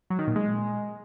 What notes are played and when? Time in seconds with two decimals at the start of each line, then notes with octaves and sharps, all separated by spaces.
0.10 F#3
0.19 D#3
0.27 A#2
0.36 G#3